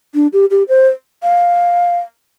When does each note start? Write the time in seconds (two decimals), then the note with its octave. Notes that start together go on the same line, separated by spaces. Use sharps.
0.15 D4
0.33 G4
0.51 G4
0.69 C5
1.23 F5